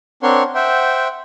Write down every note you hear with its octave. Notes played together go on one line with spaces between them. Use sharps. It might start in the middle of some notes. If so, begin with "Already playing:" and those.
C4 D4 A#4 C#5 F#5 C6
C5 E5 F#5 G5